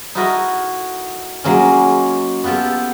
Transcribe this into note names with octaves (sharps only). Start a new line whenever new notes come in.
D#4 E4 F#4 A4 A#4 D#5
F#3 G#3 A#3 C#4
B3 F4 G4 A4